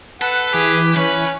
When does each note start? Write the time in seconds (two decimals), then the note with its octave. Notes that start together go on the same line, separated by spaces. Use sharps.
0.21 A4 B4 F#5
0.54 E3 G4 G#4
0.97 E3 C#4 B4